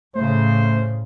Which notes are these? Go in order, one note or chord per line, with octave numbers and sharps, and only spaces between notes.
A2 C#3 A3 C5